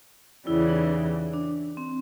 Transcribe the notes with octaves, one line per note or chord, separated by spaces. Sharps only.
E2 C#3 E3 G3 E4
D#4
D4
C4